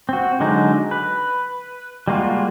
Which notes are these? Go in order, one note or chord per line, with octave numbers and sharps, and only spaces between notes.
C4 F#4
D3 F#3 G#3 D#4
B4
G3 G#3 A#3 F4 F#4